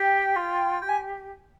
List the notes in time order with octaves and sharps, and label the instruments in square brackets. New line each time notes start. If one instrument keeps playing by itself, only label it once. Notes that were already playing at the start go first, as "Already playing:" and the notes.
Already playing: [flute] G4 [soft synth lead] G5
[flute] F4
[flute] G4 [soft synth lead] G5
[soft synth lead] G#5